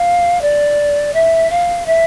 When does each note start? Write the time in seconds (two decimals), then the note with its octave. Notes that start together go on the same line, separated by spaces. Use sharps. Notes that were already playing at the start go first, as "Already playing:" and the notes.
Already playing: F5
0.42 D5
1.13 E5
1.50 F5
1.86 E5